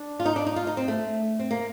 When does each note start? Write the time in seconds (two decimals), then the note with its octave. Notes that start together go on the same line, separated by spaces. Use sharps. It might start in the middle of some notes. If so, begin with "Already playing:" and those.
Already playing: D4
0.20 F4
0.26 D#4
0.36 D4
0.47 D#4
0.56 F4
0.67 D#4
0.77 C4
0.88 A3
1.40 C4
1.51 A#3